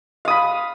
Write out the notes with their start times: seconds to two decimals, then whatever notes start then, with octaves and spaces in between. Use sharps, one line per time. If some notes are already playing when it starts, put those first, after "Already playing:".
0.25 F5
0.28 D#6
0.30 B5